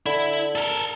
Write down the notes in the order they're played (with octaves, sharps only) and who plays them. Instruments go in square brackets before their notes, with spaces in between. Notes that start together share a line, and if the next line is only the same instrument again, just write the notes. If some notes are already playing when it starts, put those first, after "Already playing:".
[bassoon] D3 [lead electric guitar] E4
[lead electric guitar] A4 A#4